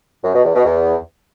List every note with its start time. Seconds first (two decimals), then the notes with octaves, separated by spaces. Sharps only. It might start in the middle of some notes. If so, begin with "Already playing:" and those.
0.23 F#2
0.34 B2
0.44 E2
0.54 B2
0.64 E2